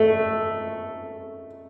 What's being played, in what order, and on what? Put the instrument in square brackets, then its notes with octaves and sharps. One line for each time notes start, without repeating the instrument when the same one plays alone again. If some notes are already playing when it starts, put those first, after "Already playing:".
Already playing: [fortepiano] A3